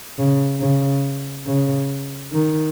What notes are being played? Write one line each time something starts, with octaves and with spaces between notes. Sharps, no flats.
C#3
C#3
C#3
D#3